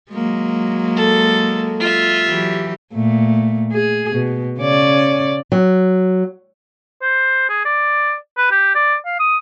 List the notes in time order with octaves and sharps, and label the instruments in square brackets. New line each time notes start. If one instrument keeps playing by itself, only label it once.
[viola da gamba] F#3 G#3 A#3
[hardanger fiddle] A4
F4 E5
[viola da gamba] E3 F#3 G4
A#2 A3
G#4
B2
C#3 C#4 D5
[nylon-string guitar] F#3
[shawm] C5
G#4
D5
B4
G4
D5
F5
D#6